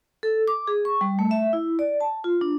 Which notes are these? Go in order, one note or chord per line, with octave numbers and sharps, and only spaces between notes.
A4
D6
G#4
C#6
G3
A3
E5
E4
D5
A5
F4
D4